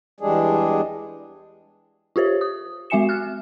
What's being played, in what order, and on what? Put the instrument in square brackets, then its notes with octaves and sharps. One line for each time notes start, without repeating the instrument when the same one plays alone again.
[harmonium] E2 G3 G#3 D4 G#4
[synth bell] F4 G4 C5 C#5
D#6
G#3 F#4 E5 G#5 C#7 E7
F6 F#6